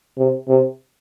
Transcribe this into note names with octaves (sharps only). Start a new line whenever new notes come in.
C3
C3